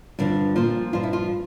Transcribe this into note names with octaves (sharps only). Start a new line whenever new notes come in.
G2 D3 F3 D4
A#2 F3 F4
G2 F3 F4
E4
F4